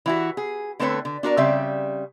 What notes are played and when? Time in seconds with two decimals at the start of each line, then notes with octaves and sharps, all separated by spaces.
0.06 E3 E4 F#4
0.37 G#4
0.80 D3 A3 C4 A4 B4 C#5
1.05 D3
1.23 D4 F#4 A#4 D5
1.37 C#3 G3 C4 D5 E5